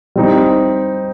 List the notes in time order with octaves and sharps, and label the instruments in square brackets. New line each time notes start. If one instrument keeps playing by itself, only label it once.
[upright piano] G3 C4 D#4